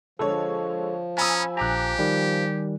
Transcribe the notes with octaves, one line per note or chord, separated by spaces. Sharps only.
D3 F3 G#3 A4 C#5
C#4 G#5 A#5 B5 D#6 E6
A#1 G4 G#5 A#5 D6 F#6
D#3 G3